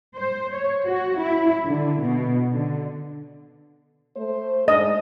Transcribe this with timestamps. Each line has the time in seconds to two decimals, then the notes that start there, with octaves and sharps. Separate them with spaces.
0.16 C5
0.54 C#5
0.86 F#4
1.18 E4
1.65 D3
2.01 B2
2.53 D3
4.16 A3 C5
4.68 G#2 D4 D#5